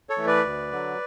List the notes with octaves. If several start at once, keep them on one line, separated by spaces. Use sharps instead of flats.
A4 C#5
E3 A3
B4 D5
D2
D3 F#3